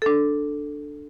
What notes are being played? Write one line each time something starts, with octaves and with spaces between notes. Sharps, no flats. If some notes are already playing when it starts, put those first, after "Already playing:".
D4 A4